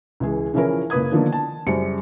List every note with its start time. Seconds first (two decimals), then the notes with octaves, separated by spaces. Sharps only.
0.20 C#2 E3 G#4
0.54 C#3 E3 F3 C#4 E4 A#4
0.90 F#1 A#3 B4 D#6 G#6
1.12 D3 D#3 F3 A#3 B3 D4
1.32 A5
1.67 F#2 C#3 G3 C5 C#7